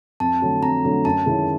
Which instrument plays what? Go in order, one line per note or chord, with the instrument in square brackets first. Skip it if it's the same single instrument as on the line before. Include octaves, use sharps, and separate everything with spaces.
[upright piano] F2 [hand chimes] A5
[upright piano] D3 F#3 A3
[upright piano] F2 [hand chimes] A#5
[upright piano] D3 F#3 A3
[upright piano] F#2 [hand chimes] A5
[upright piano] D#3 G#3 C#4 E4